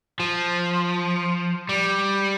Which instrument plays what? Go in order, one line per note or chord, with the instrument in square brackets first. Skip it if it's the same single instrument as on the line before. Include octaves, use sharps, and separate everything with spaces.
[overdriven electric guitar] F3
G3